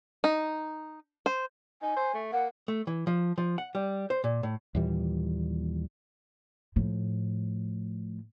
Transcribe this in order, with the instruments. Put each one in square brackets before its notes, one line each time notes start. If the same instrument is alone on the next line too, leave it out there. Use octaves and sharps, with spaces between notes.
[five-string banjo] D#4
C5
[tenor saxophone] D#4 [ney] G#5
[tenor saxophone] C5
A3
[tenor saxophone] A#3 [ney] F#5
[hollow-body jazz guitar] A3
E3
F3
F3
F#5
G3
C5
A#2
A2
[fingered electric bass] D#2 A#2 E3 G3
[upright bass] A2 F3